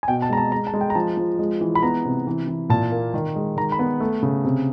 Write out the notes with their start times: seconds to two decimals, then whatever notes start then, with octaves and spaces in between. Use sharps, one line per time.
0.03 G#5
0.08 B2 G5
0.22 A5
0.30 G#3 A#5
0.37 A5
0.52 G#3 A#5
0.67 A5
0.74 G#3
0.81 G5
0.90 A#5
0.95 F3 A5
1.17 F3
1.39 G#3
1.61 E3
1.75 B5
1.83 B3 A#5
2.05 C3
2.27 E3
2.48 E3
2.69 A#2 A5
2.92 A#3
3.14 D#3
3.36 G#3
3.57 D#3 A#5
3.72 B5
3.79 B3
4.00 A3
4.23 C#3
4.44 C3